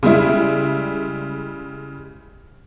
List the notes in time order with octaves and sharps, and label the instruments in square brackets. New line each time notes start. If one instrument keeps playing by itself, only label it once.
[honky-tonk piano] C#3 G3 G#3 E4